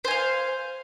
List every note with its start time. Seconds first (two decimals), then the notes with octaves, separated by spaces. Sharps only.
0.05 C5
0.08 G#5
0.11 F5